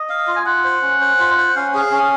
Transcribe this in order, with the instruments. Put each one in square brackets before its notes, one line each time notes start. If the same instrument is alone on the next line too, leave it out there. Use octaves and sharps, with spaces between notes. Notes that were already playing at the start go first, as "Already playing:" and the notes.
Already playing: [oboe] D#5
[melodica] F5
F4
[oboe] G#5
[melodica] F4 [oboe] F#5
[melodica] C5
C#4
C5
F4
C5
[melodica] C#4 [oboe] F5
[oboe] F#5
[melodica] G#4 [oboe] F5
[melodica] C#4